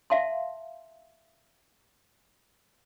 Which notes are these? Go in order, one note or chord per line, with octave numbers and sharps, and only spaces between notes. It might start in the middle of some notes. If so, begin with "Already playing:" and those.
E5 F5 A5 C6